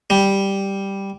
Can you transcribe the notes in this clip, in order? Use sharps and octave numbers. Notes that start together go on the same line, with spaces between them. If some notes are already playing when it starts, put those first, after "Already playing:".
G3